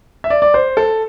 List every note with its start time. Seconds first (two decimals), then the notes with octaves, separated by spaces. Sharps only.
0.24 E5
0.30 D5
0.42 D5
0.54 C5
0.77 A4